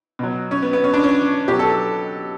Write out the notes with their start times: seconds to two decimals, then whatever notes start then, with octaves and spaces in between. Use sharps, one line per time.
0.19 B2 F#3
0.51 C#4
0.63 B3
0.73 B3
0.84 C#4
0.93 D4
1.04 C#4
1.48 B2 G4
1.52 F#3
1.59 A4
1.69 A4